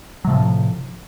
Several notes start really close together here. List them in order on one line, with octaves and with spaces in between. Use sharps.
F#3 C3 F3 A2